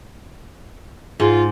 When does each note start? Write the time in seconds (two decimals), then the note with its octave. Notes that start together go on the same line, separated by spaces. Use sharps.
1.20 G#2 F4